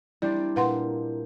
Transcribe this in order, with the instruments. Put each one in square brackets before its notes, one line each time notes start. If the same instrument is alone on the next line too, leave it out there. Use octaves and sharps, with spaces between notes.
[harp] G3 C4 D4 [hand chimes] E4 [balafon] D5
[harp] A#2 A#3 [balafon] B4 F#5 C6